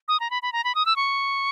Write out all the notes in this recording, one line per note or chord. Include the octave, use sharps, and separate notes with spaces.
D#6
A#5
B5
B5
A#5
B5
D#6
E6
C#6